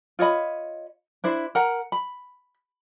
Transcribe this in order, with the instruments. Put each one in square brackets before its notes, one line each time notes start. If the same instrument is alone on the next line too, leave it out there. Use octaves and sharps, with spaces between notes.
[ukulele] F4 C#5 D#5 B5
D4 E4 C5
A#4 F#5 A#5
B5